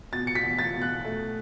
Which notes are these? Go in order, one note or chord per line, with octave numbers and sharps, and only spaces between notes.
B2 A6
C#7
B6
E2
A6
B2
F#6
A3